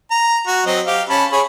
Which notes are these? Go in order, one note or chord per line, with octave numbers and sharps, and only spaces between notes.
A#5
F#4
F#3 C4 D#5
G4 F5
C#4 A5 B5
G#4 C#5 B5